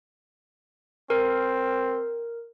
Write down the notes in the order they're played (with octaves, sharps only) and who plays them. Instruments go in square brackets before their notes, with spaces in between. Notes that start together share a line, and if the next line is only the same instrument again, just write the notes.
[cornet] C4 [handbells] A#4